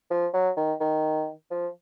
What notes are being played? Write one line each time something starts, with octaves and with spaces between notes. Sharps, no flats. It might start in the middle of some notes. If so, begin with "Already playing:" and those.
F3
F#3
D#3
D#3
F3